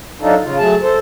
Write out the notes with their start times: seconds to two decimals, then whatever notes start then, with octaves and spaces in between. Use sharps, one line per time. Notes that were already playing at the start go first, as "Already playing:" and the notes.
0.21 F#3 D4 D#4 F4 A4
0.43 C#3 F4
0.59 F#3 A3 G#4 A5
0.82 A4 C5